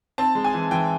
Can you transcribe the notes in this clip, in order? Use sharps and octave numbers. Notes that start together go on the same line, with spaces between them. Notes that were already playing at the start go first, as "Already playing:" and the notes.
C4 A5
G#3
G#5
E3
E3 G5